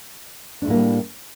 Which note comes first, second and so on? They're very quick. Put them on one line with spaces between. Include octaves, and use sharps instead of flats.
D4 A3 A2 A#3 G3